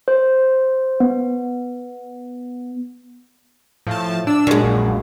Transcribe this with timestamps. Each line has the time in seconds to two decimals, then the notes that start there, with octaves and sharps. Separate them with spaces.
0.08 C5
1.00 B3
3.87 A2 F3 A5
4.27 D4 E6
4.47 F#2 A#2 G#3
4.64 A#1